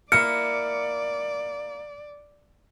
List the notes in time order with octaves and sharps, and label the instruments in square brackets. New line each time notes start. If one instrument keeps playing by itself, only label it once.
[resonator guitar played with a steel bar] A#3 E4 [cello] D5 [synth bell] F6 [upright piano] C#7